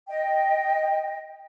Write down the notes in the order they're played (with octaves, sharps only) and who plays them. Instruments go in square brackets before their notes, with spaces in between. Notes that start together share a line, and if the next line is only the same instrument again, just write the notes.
[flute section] D#5 G5